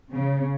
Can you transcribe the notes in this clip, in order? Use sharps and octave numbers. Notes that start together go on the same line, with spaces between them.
C#3